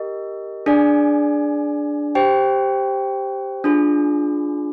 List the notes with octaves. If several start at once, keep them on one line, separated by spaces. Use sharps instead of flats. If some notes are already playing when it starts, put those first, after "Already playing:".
Already playing: G4 A#4 D#5
D4 G#4 D5 G#5
G4 C5 G5
D4 F4 G#4